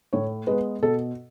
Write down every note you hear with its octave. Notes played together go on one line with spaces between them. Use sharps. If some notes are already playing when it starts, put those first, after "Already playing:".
A2 C#5
G#3 B3 B4
B2 A4